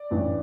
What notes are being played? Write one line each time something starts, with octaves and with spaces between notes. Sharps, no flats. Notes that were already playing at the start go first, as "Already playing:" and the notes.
Already playing: D5
A1 G2 E3